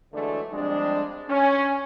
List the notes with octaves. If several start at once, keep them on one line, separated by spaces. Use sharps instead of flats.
D3 E3 F#3 G#3 A3 D4
F2 G3 G#3 D4
C#4